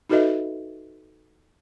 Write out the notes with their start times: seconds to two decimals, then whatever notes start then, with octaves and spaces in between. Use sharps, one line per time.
0.09 D#4 F#4 A4 B4 D#5 E5